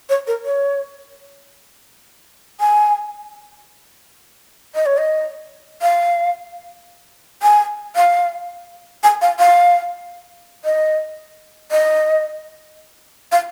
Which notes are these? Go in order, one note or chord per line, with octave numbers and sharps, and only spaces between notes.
C#5
A#4
C#5
G#5
D#5
C#5
D#5
F5
G#5
F5
G#5
F5
F5
D#5
D#5
F5